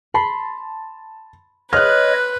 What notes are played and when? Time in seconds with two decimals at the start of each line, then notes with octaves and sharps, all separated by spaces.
0.14 A5 B5 C6 C7
1.73 B4 C#5 D#5 C6 D#6 F6 F#6